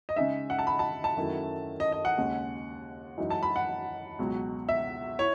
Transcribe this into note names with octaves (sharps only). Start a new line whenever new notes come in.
D#5
C#3 G#3 D#4 E5
F#5
A5
B5
A5
A5
F#2 D#3 A3 C#4 E4
D#5
D#5
F#5
D#2 C#3 G#3
F#2 E3 G#3 D#4
A5
B5
F#5
C#2 B2 F#3
E5
E4 C#5